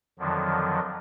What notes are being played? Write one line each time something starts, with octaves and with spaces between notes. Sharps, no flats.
F2 D3 D#3 F3 F#3